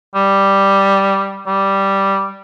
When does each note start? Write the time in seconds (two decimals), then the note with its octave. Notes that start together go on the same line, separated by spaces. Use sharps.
0.15 G3
1.47 G3